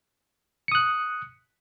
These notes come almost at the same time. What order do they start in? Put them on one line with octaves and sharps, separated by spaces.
C#7 D#6 F#6